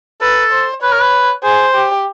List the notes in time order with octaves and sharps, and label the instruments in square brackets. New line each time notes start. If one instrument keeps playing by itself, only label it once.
[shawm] A4 [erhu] B4
[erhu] C5
[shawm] B4 [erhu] C#5
[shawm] A#4
B4
[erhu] G#4 [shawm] C5
[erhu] G4